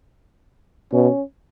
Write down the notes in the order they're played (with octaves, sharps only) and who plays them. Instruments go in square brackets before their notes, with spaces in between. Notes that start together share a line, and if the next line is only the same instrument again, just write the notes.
[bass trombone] B2 [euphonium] C#4